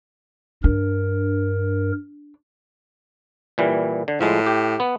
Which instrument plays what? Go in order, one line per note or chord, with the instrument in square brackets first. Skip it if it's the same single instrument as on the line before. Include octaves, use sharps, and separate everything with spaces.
[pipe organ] G2 A#4 [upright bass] D4
[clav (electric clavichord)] A#2 E3 G3
D3
[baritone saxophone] A2 [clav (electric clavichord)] F3 G#3
[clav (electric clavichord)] G4
B3